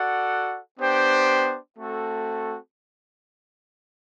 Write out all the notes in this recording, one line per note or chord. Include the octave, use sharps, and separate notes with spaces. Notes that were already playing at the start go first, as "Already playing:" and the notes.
Already playing: F#4 A4 D5 F#5
B3 D4 G4 C5 G5
A3 C4 F#4 A4